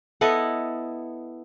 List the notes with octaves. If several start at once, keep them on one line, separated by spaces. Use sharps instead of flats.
B3 E4 A4 D#5